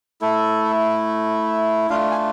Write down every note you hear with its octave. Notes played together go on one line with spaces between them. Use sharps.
A3 E4 A4
A3 D4 F4 F5
G#5